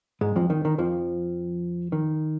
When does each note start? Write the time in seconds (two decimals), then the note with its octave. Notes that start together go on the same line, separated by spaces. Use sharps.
0.21 G#2 G#3
0.36 F2 F3
0.50 D#3
0.65 D#3
0.78 F2 F3
1.92 D#3